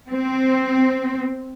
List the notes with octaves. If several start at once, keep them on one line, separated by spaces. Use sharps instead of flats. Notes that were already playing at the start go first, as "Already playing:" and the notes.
C4